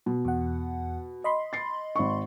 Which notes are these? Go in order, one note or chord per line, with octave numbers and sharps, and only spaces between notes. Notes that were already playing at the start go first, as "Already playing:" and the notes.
B2
E2 F#5
D#5 B5 C6
A6 C7
G#1 C#6